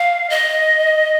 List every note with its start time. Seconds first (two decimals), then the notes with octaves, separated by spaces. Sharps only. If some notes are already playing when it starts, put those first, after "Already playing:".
Already playing: F5
0.30 D#5